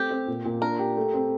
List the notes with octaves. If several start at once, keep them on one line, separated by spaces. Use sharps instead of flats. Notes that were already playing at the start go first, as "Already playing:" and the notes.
Already playing: A3 C4 G4
C4
A#2
A#2
D4 A#4
G4
A3
C4